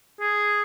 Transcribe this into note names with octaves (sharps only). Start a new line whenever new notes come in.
G#4